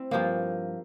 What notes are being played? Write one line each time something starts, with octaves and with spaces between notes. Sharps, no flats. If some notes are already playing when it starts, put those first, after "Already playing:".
Already playing: C4 E4
G2 F3 A#3